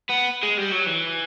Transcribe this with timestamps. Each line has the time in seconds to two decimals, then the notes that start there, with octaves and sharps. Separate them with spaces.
0.09 B3
0.43 G#3
0.58 G3
0.72 F#3
0.87 E3